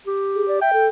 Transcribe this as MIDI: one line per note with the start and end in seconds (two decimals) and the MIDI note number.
0.07 0.60 67
0.35 0.46 68
0.48 0.58 74
0.61 0.71 76
0.61 0.87 79
0.73 0.89 69